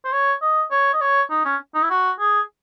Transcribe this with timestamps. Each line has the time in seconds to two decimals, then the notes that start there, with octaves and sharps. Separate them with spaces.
0.05 C5
0.12 C#5
0.42 D#5
0.71 C#5
0.94 D#5
1.01 C#5
1.30 D#4
1.45 C#4
1.75 D#4
1.83 E4
1.90 F#4
2.19 G#4